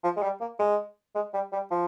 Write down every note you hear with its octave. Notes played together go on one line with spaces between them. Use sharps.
F3
G#3
G3
A#3
G#3
G#3
G3
G3
F3